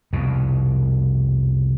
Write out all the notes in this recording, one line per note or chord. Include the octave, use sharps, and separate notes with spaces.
C2 F2 B2